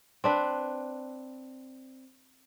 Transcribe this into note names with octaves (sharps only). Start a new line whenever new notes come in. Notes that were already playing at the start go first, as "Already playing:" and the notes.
C4 D4 B4